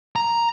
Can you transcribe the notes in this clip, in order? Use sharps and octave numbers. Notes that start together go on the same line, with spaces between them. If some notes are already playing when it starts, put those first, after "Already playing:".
A#5